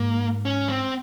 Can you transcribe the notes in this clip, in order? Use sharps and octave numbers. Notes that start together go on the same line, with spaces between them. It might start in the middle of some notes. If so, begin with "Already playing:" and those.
Already playing: G#2 A#3
C#4
C4